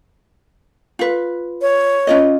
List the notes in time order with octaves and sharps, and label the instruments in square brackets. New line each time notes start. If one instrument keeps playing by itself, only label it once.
[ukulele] F4 B4
[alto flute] C#5
[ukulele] C#4 F4 D#5